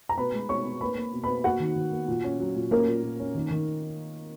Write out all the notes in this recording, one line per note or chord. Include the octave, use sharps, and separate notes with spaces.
A#5
B2 B4 B5
G#3
B2 C#5 C#6
B2
A#3 B4 B5
A#3
B2
B2 B4 B5
A#3 F#4 F#5
D#3
D#3
A#3
A#2
C#4
F#3
A#2
A#3 C#4 A#4
A#2
A#2
C#4
D#3
D#3